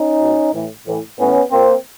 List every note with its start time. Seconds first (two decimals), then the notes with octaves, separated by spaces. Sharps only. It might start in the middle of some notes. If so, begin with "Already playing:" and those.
Already playing: C#4 D#4
0.20 B2
0.54 A2 E3
0.87 A2 E3
1.19 A2 E3 B3 C#4
1.51 A#2 A#3 C4